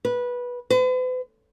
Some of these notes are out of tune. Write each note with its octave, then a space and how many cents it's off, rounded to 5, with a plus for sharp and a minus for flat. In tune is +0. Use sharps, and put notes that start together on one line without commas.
B4 -15
B4 +45